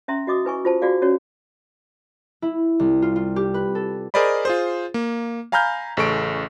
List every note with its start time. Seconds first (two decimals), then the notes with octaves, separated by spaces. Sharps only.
0.08 C#4 E5 A#5 C6
0.27 F#4 D#5 D6 D#6
0.45 E4 B4 G#5 C#6
0.65 F4 C5 A5
0.82 F4 F#4 G#4 D5 F5
1.02 C#4 F#4 C#5
2.42 E4
2.79 C2
3.02 F4
3.16 F4
3.36 G4
3.54 B4
3.75 A4
4.14 G#4 A#4 C5 D5 D#5 B5
4.45 F4 G#4 C5
4.94 A#3
5.52 F5 G#5 A#5 B5 F6 G6
5.97 A1 C#3 A4 C#6 D7